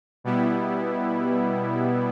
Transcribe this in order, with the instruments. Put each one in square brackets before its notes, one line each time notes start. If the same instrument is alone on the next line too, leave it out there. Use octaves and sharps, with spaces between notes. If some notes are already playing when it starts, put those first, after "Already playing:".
[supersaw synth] B2 G3 B3 E4